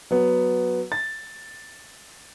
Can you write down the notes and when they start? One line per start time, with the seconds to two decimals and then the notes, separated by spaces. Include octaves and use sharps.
0.11 F#3 B3
0.92 A6